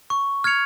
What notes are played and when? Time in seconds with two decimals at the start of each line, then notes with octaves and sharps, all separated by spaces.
0.10 C#6
0.44 F6 G#6 C#7 F7